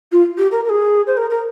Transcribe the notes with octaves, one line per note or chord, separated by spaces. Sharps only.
F4
G4
A#4
A#4
G#4
C5
A#4
A#4